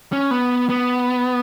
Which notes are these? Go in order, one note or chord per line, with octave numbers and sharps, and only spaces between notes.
C#4
B3
B3